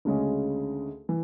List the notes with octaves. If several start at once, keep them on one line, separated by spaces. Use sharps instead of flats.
D2 C#3 G#3 C#4 G#4
E3